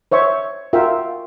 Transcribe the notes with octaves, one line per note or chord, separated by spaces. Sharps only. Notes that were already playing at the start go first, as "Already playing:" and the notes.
C5 C#5 E5 C#6
F4 F#4 A#4 E5 F5 G5